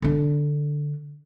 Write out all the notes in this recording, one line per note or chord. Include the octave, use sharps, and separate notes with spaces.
D3 D4